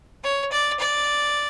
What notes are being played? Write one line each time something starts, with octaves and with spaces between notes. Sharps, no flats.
C#5
D5
D5